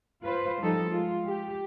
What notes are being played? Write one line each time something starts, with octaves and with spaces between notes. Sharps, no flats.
F4 B4 C5
F3 G3 D#4 A4
G#3 F4
G4